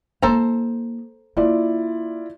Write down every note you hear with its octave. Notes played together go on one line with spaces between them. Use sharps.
A#3 E4 A4 C5 A#5
A#3 E4 F4 D5